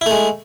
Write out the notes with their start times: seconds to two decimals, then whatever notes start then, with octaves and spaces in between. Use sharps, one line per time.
0.01 E4
0.06 A3
0.11 G#3